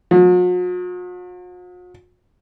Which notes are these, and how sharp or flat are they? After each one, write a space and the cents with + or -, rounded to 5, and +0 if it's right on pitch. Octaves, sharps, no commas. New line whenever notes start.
F#3 -45